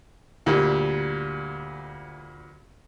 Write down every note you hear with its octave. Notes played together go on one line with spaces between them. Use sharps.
D2 A#2 G3